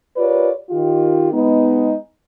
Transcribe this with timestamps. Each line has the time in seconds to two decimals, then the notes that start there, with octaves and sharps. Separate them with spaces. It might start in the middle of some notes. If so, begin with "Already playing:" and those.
0.17 F4 G4 A#4 B4 C#5 D5
0.70 D#3 F4 G4
1.32 G#3 B3 D#4